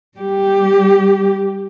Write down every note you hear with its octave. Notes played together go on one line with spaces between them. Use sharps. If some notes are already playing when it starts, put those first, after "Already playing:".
G3 G4